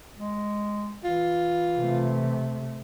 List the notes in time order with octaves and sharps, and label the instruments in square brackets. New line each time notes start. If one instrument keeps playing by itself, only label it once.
[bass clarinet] G#3
[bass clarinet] E3 [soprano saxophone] F4
[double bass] C3 A3